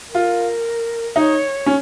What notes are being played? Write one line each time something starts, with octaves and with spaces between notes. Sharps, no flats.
F4 A#4
D#4 C#5
C#4